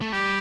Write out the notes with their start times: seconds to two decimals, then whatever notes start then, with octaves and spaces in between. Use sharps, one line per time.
0.01 A3
0.12 G3 G4